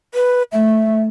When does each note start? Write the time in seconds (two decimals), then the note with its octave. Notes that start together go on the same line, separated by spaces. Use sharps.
0.14 B4
0.52 A3 E5